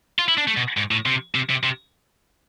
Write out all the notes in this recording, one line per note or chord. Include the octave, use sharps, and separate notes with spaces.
F4
E4
D4
A3
B2
G#2
A2
C3
C3
C3
C3